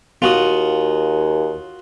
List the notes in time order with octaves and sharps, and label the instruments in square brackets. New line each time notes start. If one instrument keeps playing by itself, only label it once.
[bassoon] D#2 [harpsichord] F4 F#4 D#6